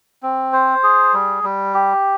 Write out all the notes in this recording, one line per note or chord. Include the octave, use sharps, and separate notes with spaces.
C4
C5
G#4
G3
G3
G4